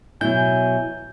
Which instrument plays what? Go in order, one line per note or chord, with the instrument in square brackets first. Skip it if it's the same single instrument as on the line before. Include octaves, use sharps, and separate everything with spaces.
[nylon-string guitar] B2 F#3 E4 [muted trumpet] G#5 [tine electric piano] G6